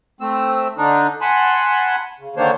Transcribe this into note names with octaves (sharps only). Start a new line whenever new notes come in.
A3 C4 E6
D3 D4 D#4
F#5 G#5 A5 B5 C6
C#3
D3 D#3 A#3 D4 C5 C#5